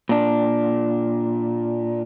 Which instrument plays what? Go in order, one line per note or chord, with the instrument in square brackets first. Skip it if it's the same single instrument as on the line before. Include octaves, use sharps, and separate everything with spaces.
[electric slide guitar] A#2 D4